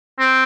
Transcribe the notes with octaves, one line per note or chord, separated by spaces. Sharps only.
C4